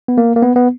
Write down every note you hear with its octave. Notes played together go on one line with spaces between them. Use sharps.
B3
A#3
A#3
B3
B3